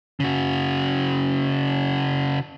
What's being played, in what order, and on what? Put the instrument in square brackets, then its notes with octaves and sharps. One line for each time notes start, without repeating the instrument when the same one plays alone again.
[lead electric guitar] C#3 F#4